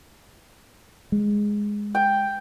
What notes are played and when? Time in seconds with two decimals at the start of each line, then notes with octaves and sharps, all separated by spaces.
1.12 G#3
1.95 G5